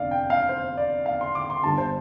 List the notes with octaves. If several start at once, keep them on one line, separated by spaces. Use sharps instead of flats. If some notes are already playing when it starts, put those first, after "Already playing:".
Already playing: F1 F2 D3 D5 F5
G5
F5
C5
D5
F5
C6
D6
C6
G1 G2 D3 A5
C5